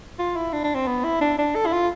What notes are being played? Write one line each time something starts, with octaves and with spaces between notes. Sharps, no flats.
F4
E4
D4
D4
C4
B3
E4
D4
D4
A4
E4
F4